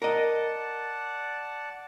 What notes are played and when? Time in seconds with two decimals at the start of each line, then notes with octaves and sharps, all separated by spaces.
0.02 A#4 D5 D#5 F#5 A5